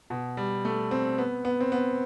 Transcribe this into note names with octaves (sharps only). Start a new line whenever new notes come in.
B2
G3
A3
C4
B3
B3
C4
B3